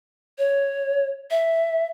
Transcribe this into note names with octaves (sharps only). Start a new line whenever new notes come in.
C#5
E5